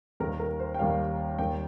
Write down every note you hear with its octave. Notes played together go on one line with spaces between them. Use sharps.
D#2 D#3 G3 A#4
A#4
C5
G5
D#2 D#3 G3 F5
D#2 D#3 G3 G5